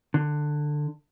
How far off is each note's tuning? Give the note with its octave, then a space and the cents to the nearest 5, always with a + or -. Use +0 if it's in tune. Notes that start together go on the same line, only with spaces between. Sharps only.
D3 +15